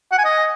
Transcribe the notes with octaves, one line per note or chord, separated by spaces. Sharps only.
F#5
G#5
D#5